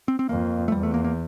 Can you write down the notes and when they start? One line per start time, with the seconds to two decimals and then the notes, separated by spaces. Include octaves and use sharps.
0.08 C4
0.19 C4
0.29 F2 A#3
0.68 A3
0.72 E2 G3
0.83 A3
0.94 A#3
1.04 A#3